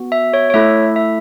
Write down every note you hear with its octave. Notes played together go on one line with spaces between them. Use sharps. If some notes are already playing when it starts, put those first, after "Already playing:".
Already playing: B3 F#4
E5
C#5
C#5
A3 E4 A4 E5
E5